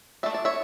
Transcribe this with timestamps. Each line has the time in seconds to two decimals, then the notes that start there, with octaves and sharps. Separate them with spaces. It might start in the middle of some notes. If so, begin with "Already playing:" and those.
0.23 A3 D4 E5
0.34 D5
0.45 C#5 E5